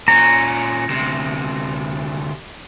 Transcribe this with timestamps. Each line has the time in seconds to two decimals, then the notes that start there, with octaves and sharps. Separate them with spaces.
0.08 A#2 C#4 A#5
0.89 D2 C3